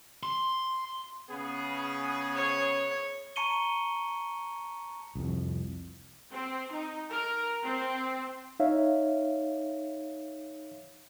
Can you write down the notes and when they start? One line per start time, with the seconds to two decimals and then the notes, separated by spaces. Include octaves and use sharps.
0.23 C6
1.30 C#3 B3 G#4
2.35 C#5
3.36 A5 A#5 C#6 C#7 D#7 G7
5.16 C2 F2
6.31 C4
6.72 D#4
7.10 A#4
7.63 C4
8.60 D#4 C#5 E5 F5